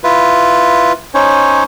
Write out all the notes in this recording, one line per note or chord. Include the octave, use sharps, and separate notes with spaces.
E4 F4 B4
C#4 D#4 C5 C#5